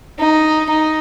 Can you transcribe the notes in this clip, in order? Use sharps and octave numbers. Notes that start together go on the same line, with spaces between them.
D#4
D#4